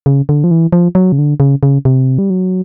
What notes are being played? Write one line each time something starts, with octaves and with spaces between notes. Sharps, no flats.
C#3
D3
F3
E3
F3
F#3
C#3
D3
C#3
C#3
C3
G3
F#3